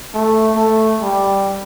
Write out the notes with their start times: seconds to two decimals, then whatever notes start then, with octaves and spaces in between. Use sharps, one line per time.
0.14 A3
0.56 A3
1.02 G3